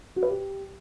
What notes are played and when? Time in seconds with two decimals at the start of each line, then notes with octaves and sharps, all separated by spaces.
0.16 F#4
0.23 B4
0.29 G4